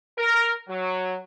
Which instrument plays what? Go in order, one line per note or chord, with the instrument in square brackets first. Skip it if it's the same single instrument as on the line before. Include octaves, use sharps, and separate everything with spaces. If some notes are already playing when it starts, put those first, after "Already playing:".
[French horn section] A#4
F#3